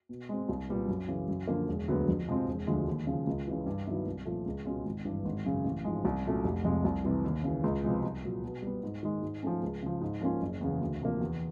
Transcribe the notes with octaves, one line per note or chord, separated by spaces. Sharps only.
B2
G#3 C4
C2
A#2 G3 B3
F#2
C#3 E3
F#2
D3 F3 A#3
E1
D2 D3 F#3 B3
F2
C3 F3 G#3 C4
E1
D2 D3 F3 G#3
D#2
C#3 F3
C#2
C#3 E3
G2
D#3 F#3 B3 E4
C2
A#2 F3 A3
C#2
B2 G#3 C#4 F4
G#1
G2 E3
G#1
F#2 C#3 F#3
A1
G#2 F3 G#3
C2
A#2 F#3 A3 C#4
F1
F2 C3 F3 G#3
C2
C3 E3 G3
D#2
C#3 E3
C#2
C3 F3 G#3 B3
C2
A#2 F#3
B2
G3 B3
G#2
D#3 G#3
G#2
F3 A3 C#4
C#2
C#3 F3
G#2
F3 A#3 C#4 F4
F#1
E2 C#3
D2
C3 F3 A#3
E2